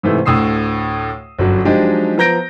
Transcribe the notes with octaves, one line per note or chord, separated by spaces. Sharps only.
G#2 C3 E3 A3
D2 A2 D#6 E6 C7
G1 F#2 F#3
F3 F#3 G#3 D4 D#4 G4
F3 B3 A#5 G6 A#6 D7